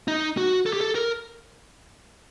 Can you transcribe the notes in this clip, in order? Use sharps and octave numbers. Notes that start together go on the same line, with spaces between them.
D#4
F#4
A4
G4
A4
A#4